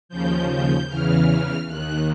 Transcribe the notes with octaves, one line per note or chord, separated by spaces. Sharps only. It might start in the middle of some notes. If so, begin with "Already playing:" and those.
D#2 C#3 F3 G6
G6
E2 C#3 E3 F6
D#2 D#3 F#6